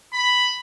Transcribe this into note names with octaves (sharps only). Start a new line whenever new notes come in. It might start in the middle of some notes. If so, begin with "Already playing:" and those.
B5